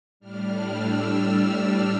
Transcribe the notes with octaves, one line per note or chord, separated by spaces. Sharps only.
A2 G3 D4 F6
E6
F6